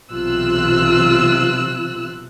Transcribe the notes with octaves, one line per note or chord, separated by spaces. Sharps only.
B1 C3 E3 F4 E6 F#6